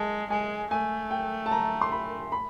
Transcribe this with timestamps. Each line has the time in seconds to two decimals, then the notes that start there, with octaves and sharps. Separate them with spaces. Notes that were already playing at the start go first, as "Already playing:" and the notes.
Already playing: G#3 A5
0.30 G#3 G#5
0.71 A3 G#5
1.11 G5
1.46 A5
1.51 A#5
1.81 C6
1.92 B5
2.32 B5